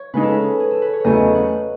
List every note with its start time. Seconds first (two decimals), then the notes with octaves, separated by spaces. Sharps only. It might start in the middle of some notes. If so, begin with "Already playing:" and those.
Already playing: C#5
0.14 C#3 G#3 D#4 B4
0.23 A4
0.32 B4
0.60 G#4
0.71 A4
0.82 B4
0.93 C#5
1.04 E2 C#3 F#3 A3 D#5
1.35 F#5